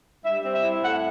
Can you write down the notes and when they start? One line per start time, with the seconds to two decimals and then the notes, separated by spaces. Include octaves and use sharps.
0.24 G3 E5
0.44 C4
0.53 E5
0.63 E4
0.82 A2 F#5